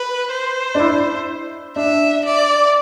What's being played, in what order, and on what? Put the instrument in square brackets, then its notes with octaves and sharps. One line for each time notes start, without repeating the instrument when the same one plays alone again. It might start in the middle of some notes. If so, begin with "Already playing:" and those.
Already playing: [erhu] B4
C5
[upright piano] D4
E4
[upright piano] D4 [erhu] E5
[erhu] D5